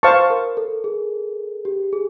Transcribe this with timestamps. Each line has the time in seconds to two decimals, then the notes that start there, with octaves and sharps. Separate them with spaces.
0.03 B4 C5 F5 A5 C#6
0.30 A#4
0.57 A4
0.84 G#4
1.65 G4
1.93 G#4